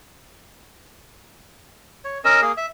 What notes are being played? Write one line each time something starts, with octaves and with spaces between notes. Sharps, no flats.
C#5
C#4 A#4 D#5 E6
A#3 G#4
E5